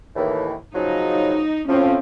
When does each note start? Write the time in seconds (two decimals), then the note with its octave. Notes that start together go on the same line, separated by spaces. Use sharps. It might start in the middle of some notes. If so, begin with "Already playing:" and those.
0.16 D#2 A2 E3
0.74 C#3 F3 F#3 D#4
1.68 A2 F3 C4 C#4